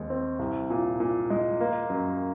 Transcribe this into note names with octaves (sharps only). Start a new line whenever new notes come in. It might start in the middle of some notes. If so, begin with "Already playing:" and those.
Already playing: D#2 G#3 C4
C4
C2
A#2
A#2
G#3
A#3
F#2